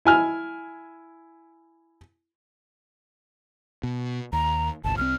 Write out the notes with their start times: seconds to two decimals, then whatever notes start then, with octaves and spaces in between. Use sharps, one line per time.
0.05 E4 G#5 F6
3.83 B2
4.33 D#2 A#5
4.84 G1 C2 A5
4.97 C2 C4 F6